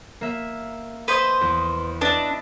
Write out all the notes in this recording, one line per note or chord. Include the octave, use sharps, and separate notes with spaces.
A#3 E5
B4 C5 D#5
E2
D4 B4 D#5 E5